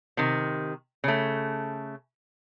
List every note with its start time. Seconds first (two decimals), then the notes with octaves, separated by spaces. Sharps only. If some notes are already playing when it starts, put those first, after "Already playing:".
0.17 C3 D#3
1.04 C#3 A3